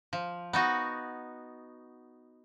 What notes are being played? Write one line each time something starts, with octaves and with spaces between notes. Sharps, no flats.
F3
B3 D#4 F#4